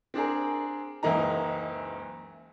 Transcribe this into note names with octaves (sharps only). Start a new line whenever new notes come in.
C4 D4 G#4 A#4
F#1 C#2 E3 A#3 D#4 A#5